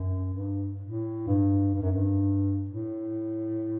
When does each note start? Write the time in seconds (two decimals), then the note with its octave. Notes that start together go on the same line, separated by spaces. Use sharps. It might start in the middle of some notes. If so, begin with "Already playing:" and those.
Already playing: F#2
0.34 G2
0.81 A2
1.27 G2
1.74 G2
1.82 F#2
1.92 G2
2.69 A2